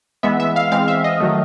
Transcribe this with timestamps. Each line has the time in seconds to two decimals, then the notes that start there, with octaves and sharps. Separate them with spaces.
0.23 E3 G#3 B3 E5
0.40 E5
0.56 F5
0.72 E3 G#3 C4 F5
0.88 E5
1.04 D#5
1.20 D#3 F#3 A3